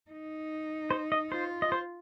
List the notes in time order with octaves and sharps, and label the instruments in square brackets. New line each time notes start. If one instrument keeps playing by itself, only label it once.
[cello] D#4
[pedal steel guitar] C5
D#5
[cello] F4 [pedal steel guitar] C5
[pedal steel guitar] D#5
C5